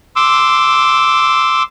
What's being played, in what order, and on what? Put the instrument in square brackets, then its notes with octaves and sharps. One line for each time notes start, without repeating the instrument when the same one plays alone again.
[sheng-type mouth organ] C6 D6 E6